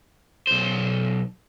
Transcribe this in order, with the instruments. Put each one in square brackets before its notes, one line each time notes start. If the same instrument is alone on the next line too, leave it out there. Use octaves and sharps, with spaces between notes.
[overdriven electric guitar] B1 C5